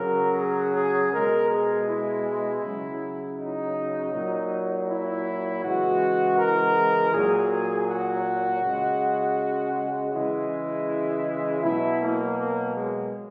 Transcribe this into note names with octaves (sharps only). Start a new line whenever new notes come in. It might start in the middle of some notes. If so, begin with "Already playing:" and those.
Already playing: C#3 F#3 A#4
G#4
G#4
B2 G#3 A#4
G#4
E4
C#3 F#3
D#4
A#2 F#3
E4
C#3 E3 G#3 F#4
A#4
A#2 F#3 G#4
F#4
C#3 G#3
C#3 E3 G#3 E4
B2 F#3 E4
A#3
A#3
G#3